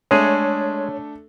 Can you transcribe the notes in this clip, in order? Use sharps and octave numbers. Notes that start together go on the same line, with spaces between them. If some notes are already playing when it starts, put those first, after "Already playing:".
G#3 A3 D4 G#4 A4 C#5